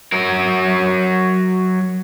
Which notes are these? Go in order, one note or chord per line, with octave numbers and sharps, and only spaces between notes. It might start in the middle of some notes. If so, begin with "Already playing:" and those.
F#3 A#4